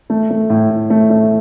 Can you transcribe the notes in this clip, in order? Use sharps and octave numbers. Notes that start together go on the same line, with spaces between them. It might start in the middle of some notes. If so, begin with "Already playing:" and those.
A3
A3
A2
A2
A3
A3